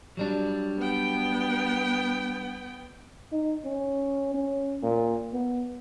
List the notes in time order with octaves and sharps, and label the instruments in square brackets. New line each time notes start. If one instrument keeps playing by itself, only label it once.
[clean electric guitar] F#3 G3 D4
[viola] B3 G5
[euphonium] D#4
C#4
C#4
A#2
B3